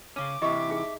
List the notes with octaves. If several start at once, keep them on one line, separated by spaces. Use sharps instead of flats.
C#3 C#4 D6
C3 E3 G4 D#5 E5
D#4 G#4